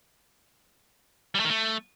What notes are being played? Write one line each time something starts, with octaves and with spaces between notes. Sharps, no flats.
G3
A3
D#3
A3